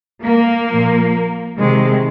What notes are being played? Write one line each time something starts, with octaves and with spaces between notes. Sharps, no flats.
A#3
A#2 F3
C3 D#3 G#3